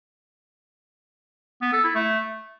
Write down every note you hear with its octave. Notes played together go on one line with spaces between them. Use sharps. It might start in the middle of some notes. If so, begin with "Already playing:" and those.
B3
A4
E4
A3